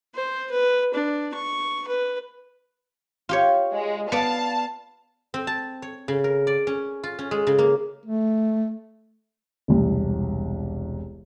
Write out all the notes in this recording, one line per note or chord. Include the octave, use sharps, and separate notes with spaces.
C5
B4
D4
C#6
B4
F4 G4 C#5
G#3
B3 D5 F5 A5
C4
A5
C#5
C#3
A#4
D5
C#4
F4
C#4
G#3
C#3
A#3
A3
E1 C2